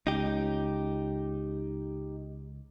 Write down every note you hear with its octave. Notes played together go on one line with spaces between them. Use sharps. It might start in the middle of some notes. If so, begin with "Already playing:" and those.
C#2 D#4 G4